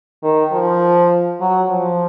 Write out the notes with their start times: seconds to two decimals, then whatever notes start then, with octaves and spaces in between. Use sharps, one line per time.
0.23 D#3
0.52 F3
1.41 F#3
1.69 F3